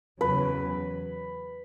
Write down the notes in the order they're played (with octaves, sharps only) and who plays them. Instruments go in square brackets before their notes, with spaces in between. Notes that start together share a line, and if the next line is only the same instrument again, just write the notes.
[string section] E2 C#3 F#3 [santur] B4